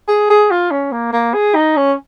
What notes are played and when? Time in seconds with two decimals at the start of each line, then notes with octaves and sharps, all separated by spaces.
0.08 G#4
0.30 G#4
0.51 F4
0.71 C#4
0.92 A#3
1.13 A#3
1.34 G#4
1.55 D#4
1.77 C#4